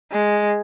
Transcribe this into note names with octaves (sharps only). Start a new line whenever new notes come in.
G#3